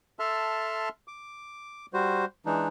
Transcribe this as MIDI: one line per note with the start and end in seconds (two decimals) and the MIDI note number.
0.19 0.89 69
0.19 0.89 76
0.19 0.89 81
0.19 0.89 84
0.19 0.89 89
1.08 1.86 86
1.94 2.25 55
1.94 2.25 66
1.94 2.25 72
2.46 2.68 52
2.46 2.68 56
2.46 2.68 62
2.46 2.68 63